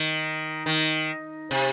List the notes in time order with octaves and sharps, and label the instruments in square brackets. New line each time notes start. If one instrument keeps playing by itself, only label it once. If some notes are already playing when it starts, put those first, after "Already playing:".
Already playing: [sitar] D#3
D#3
C3